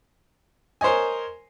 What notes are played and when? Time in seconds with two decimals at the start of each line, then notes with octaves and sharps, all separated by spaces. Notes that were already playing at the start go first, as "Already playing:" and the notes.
0.81 A#4 C5 C#5 D#5 G#5